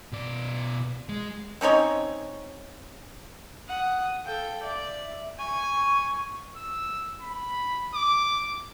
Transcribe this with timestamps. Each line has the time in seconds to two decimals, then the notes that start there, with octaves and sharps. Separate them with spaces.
0.12 B2 D5
1.09 G#3
1.61 C4 C#4 D#4 C#5
3.68 F#5 D#6
4.26 A4 F5 G5
4.63 D5 E5
5.39 G#5 C#6
6.57 E6
7.22 B5
7.94 D6